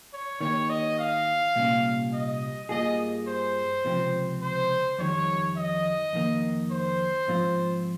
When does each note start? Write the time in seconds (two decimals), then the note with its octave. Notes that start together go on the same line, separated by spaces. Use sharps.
0.13 C#5
0.40 D#3 A#3 D#4 G4 C#5
0.69 D#5
0.98 F5
1.56 C2 A#2 G3 C#4
2.13 D#5
2.69 G2 G3 A#3 F4 G#4 D#5
3.28 C5
3.85 C#2 C3 F3 C4 G4
4.42 C5
4.99 F2 D#3 G3 C#5
5.56 D#5
6.13 F2 D#3 A#3
6.71 C5
7.28 G#2 F3 C4 F4